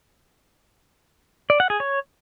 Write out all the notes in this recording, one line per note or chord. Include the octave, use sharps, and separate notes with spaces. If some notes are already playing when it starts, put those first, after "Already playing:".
D5
F#5
G#4
C#5